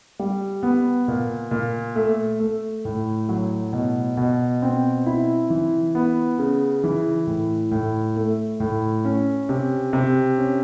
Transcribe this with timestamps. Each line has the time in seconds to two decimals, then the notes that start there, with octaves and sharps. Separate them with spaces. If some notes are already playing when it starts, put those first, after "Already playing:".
0.19 G3
0.63 B3
1.08 A#2
1.51 A#2
1.96 A3
2.40 A3
2.85 A2
3.29 F#3
3.73 B2
4.17 B2
4.62 C4
5.06 E4
5.50 E3
5.95 B3
6.39 C#3
6.84 E3
7.27 A2
7.71 A2
8.17 A3
8.60 A2
9.05 C#4
9.49 C3
9.93 C3
10.38 C#4